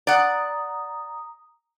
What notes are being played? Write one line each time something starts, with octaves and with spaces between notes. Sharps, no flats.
D5 F#5 A#5 D#6